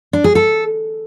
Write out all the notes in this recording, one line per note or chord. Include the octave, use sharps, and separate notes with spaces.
D4
G#4
A4